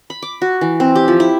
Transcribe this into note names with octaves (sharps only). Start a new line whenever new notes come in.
B5
D6
F#4
E3
C4
G4
F3
E4